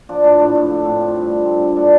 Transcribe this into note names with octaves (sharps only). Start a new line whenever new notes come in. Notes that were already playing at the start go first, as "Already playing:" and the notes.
F3 D4
A2 D4
A2 D4
A2
F3
A2 C4
F3
G2
F3
G2 C4
D3
A2 D4